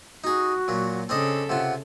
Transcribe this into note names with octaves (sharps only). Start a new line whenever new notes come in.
D#4 F#4 G#4
A#2 F#3
C#3 C4 D4 A4 D#5
C3 F4 F#5